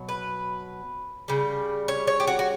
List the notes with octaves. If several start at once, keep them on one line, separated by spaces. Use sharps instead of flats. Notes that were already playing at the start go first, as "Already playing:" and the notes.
Already playing: B2 F#3
B4
C#3 G3
C#5
C#5
G4
F#4
F#4